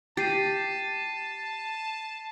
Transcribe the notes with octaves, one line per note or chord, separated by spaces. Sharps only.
G4 A5 A6 C7 D#7